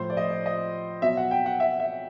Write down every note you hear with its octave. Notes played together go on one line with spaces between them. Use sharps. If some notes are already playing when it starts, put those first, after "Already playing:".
Already playing: A2 F3 C5
D5
D#5
D5
D#5
B2 F#3 E5
F#5
G5
F#5
E5
E5